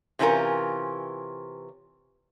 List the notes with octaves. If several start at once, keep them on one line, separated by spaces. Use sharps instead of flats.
C3 E3 C#4 F4 A#4